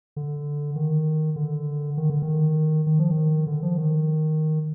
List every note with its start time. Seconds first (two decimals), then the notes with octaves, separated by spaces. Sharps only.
0.16 D3
0.76 D#3
1.36 D3
1.97 D#3
2.10 D3
2.22 D#3
2.87 D#3
2.99 F3
3.10 D#3
3.47 D3
3.63 F3
3.78 D#3